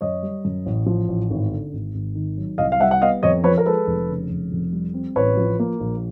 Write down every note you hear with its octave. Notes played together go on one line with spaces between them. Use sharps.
F#2 C#5 D#5
G3
F#2
A1
F3
A1
G#1
D3
G#1
G#1
D#3
F#3
C2 D#5 F5
F5
G3 E5 F#5
F#5
B3 D#5 F5
F2 C#5 D#5
F3 B4 C#5
A#4
G#3 A4 B4
F1
C#3
F1
F2
G3
C4
A1 B4 C#5
F3
A#3
A#1